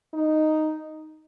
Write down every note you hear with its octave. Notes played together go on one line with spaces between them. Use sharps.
D#4